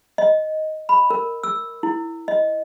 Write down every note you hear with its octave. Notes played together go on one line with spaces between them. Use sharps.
D#5
B5
A#4
E6
E4
D#5